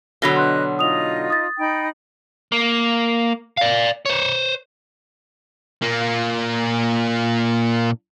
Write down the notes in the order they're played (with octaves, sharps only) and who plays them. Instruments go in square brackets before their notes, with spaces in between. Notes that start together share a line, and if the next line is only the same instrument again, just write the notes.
[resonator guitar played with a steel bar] B2 D3 F#3 [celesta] B5 A#6 G7
[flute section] B4 D#5 F#6 [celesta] C6
[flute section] D#4 F4 D#5 [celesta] D#6 F7
[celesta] D#6 A6
[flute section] D#4 G5 B5
[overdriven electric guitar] A#3
D5 F5
C5 C#5
[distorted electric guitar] A#2 A#3